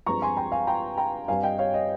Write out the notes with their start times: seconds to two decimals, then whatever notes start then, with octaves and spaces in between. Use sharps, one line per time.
0.06 G2 F3 G#3 C4 A#5 C#6
0.22 G#5 C6
0.37 G5 A#5
0.52 F5 G#5
0.67 G5 A#5
0.98 G5 A#5
1.28 G2 G3 C4 F5 G#5
1.43 D#5 G5
1.59 C#5 F5
1.74 D#5